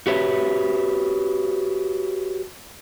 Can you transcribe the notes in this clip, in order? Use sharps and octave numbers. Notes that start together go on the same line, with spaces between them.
F#4 G4 B4 C#5 E5